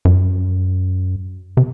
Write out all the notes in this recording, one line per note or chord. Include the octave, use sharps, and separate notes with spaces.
F#2
C3